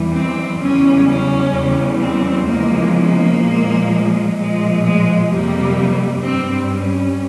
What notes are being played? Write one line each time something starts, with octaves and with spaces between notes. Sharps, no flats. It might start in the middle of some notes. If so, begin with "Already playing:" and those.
Already playing: E2 E3 G3
C4
E2 C#3 G3 C#4
C#4
E2 C#3 G3
C4
E2 C#3 F3 G#3 A#3
A#3
A#2 F3 G#3
A#2 F3 G#3
G#3
F2 C3 G3 A#3
G2 G3 C4
C#4